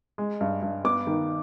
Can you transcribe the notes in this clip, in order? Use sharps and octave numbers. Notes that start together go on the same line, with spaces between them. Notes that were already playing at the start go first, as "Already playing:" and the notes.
G#3
G2
G2
B3 D6
D#3